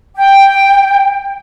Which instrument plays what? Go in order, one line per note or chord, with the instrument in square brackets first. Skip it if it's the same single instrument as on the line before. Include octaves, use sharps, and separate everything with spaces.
[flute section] G5